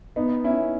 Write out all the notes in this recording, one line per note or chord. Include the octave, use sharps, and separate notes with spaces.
B3 D#4
C#4 E4